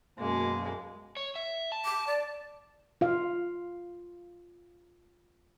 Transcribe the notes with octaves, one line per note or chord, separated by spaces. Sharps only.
F#2 B2 G#3 A#3
C#5
E5
A5
D6
D5
F4 F5